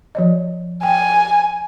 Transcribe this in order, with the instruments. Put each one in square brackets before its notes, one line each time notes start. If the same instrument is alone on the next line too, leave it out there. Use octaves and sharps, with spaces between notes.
[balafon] F3 C#5 D#5
[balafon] G5 [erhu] G#5